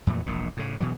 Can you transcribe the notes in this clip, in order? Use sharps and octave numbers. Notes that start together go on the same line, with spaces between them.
F2 A#2 E3 A3
E1 A#1 A#2
A2 C#3
B2 E3 F#3